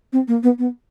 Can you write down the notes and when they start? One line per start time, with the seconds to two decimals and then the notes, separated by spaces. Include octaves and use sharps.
0.13 C4
0.28 A#3
0.43 B3
0.59 B3